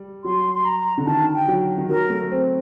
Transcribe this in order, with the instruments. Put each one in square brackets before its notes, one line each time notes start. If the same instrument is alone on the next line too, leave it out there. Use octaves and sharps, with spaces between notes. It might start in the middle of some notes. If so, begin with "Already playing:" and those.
Already playing: [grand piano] G3
[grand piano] F#3 [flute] C6
[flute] C6
A#5
[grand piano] D3
[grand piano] D#3 [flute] A5
[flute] G5
[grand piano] F#3
D#3
[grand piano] F#3 [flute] A#4
[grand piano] A3
C4